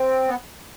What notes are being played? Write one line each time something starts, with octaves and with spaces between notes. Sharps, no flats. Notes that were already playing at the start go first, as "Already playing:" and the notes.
Already playing: C4
B3